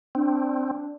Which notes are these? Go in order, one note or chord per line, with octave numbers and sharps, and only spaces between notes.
C4 D4